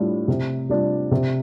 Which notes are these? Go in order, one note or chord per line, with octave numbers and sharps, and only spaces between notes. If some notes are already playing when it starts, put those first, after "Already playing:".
Already playing: A2 G3 D4 F4
C3
G3 D4 F4
C3